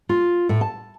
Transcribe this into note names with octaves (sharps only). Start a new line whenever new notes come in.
F4
A2
A5